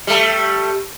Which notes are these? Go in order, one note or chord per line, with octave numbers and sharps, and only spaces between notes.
G3 A3